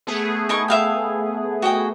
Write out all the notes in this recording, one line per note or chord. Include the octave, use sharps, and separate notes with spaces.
A3 B3 G#4
D#4 A#4 C#6
E5 F5 G5
F#4 D#5 G5